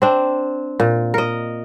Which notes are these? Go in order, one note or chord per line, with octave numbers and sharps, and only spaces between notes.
C4 D4
A#2
A#4 D#5